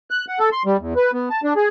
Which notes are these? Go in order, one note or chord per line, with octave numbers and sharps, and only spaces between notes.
F#6
F#5
A4
C6
G3
E2
B4
B3
A5
D4
G#4